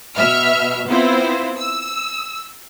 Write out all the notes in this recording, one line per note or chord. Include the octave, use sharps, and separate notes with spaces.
B2 E5 F6
B3 C4 E4 F4 C5
E6